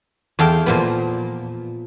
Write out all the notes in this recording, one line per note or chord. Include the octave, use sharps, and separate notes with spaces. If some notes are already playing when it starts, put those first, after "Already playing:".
E2 A4 F5 G5
A#2 F3 B3